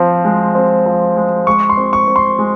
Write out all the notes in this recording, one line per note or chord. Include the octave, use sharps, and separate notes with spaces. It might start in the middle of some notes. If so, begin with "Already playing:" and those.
Already playing: F3 C4
G#3
C4
F3
G#3
G#3 C#6
C6
C4
C#6
C4
C6
G#3